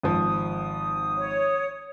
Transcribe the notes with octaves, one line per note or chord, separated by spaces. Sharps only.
G#1 F3 D#6
C#5